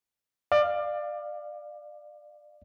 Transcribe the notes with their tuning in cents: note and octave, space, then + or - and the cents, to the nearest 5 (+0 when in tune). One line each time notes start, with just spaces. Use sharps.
D5 +25 F5 +0